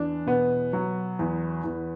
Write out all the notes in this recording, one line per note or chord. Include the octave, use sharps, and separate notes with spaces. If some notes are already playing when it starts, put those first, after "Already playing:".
Already playing: E2 D4
B2 B3
F#3
E2
E2